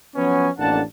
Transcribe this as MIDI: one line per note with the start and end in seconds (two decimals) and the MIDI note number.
0.15 0.50 53
0.15 0.50 54
0.15 0.50 59
0.15 0.50 61
0.58 0.81 33
0.58 0.81 41
0.58 0.81 58
0.58 0.81 62
0.58 0.81 78
0.58 0.81 81